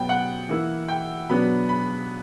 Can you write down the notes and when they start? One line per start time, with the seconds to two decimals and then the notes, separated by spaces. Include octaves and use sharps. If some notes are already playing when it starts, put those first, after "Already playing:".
Already playing: B2 F#3 B3 G5
0.09 F#5
0.49 E3 A#3 E4
0.88 G5
1.29 B2 F#3 B3 D4 B5
1.69 B5